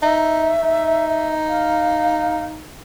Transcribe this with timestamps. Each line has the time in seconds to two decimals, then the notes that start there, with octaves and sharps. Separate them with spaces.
0.03 D#4 E5
0.63 D#4
1.48 F5